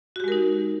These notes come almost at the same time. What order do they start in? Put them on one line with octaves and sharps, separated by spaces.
F#4 G4 G#3 A#4 D#4